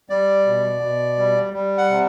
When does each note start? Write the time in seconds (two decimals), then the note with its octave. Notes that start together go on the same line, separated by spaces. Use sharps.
0.09 G3 D5
0.45 B2
0.81 B2
1.18 G3
1.53 G3
1.78 F#5
1.90 C3